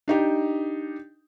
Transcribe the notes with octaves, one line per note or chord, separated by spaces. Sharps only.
D4 D#4 G4